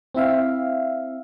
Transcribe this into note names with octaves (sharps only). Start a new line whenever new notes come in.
C4 E4 E5 F5